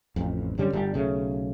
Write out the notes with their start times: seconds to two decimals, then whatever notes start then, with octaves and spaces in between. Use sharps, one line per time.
0.16 A1 F2
0.58 F#2 D3 G3 C#4
0.73 G1 G3
0.94 B1 C#3 A3